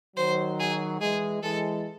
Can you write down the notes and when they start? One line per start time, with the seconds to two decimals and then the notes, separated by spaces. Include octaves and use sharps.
0.17 D#3 F#3 C5
0.59 G#4
1.01 E3 G#3 G#4
1.43 E3 G#3 A4